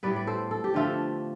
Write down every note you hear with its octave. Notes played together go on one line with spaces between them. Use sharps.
A2 G3 B3 B4 D5
D5
A4 C5
A4
G4
D3 F3 A3 F4 A4